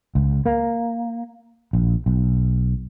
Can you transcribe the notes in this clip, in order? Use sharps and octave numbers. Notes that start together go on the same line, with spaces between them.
C#2
A#3
A#1
B1